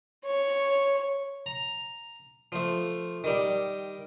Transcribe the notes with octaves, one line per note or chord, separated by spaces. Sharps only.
C#5 C#6
A#5
F3 A3
D#3 G3